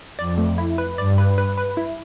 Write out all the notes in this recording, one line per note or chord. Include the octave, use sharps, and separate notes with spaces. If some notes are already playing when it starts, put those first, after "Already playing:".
F2 D5
A3
E4
B4
G2 D5
B4
B4
B4
E4